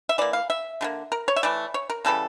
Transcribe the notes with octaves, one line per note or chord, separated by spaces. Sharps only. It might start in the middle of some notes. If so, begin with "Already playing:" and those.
E5
E3 A#3 D5
F5
E5
D3 G3 A#3
A#4
C#5
E5
E3 A3 D5
C#5
A#4
C#3 E3 G3 A4